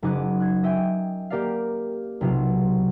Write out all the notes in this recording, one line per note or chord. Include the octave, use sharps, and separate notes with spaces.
F#1 D#4 G#4 D#5 D6 F#6
F#6 G#6
D#5 E5 G5 G#5
A#3 G4 A#4 D5 F5
B1 C3 F4